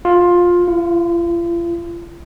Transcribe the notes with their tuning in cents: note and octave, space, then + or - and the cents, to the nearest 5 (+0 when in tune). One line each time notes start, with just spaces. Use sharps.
F4 +15
F4 -40